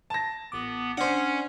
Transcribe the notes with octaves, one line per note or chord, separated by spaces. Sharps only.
A5 A#6
A1 B3 D6
C#4 D4 C5 D5 F#5